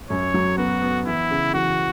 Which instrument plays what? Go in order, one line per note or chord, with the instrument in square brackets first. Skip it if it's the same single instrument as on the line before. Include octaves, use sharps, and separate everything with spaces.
[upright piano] F#2 [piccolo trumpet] C#5
[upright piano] F#3
[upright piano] B3 [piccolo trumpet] F#4
[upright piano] B3
[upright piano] E3 [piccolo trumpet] E4
[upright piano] C#3
[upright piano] E3 [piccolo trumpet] F#4